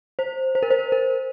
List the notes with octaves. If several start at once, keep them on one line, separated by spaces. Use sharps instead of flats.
C5
C5
A#4
C5
A#4